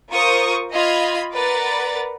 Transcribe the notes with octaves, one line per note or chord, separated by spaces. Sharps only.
F4 A#4 C5 C#6 D#6
F4 D#5 F5 B5 G#6
A#4 B4 D5 F#5 A6